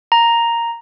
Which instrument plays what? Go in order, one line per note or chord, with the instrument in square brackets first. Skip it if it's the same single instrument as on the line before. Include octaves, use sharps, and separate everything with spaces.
[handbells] A#5